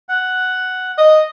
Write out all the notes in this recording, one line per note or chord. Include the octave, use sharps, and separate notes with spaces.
F#5
D#5